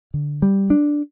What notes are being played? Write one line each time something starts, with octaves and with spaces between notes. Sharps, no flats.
D3
G3
D4